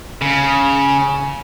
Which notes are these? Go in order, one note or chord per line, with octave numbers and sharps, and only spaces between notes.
C#3